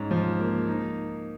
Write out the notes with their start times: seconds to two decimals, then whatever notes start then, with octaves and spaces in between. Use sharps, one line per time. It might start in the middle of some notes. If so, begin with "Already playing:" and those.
Already playing: G#2 C#4
0.11 F3
0.40 A#3
0.67 D#4